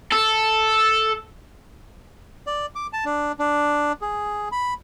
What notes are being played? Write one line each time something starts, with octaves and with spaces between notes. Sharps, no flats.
A4
D5
D6
A5
D4
D4
G#4
B5